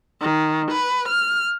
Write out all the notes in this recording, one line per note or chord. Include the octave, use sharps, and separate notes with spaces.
D#3
B4
F6